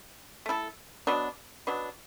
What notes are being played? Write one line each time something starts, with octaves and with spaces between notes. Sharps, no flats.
A3 E4 A4
B2 F#3 B3 D4
B2 F#3 B3 D4